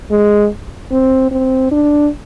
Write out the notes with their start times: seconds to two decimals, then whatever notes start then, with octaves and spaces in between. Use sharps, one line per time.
0.11 G#3
0.91 C4
1.31 C4
1.72 D4